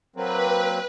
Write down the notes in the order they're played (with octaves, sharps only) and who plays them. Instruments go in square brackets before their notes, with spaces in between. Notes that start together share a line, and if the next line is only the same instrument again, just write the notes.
[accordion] F#3 A#3 C4 [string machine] B4